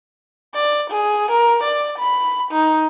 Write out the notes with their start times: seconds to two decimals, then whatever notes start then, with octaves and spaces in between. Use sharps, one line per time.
0.54 D5
0.91 G#4
1.31 A#4
1.64 D5
1.98 B5
2.52 D#4